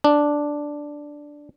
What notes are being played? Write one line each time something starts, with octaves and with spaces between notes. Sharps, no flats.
D4